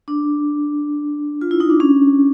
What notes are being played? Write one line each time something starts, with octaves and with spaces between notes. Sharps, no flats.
D4
F4
E4
D#4
D4
C#4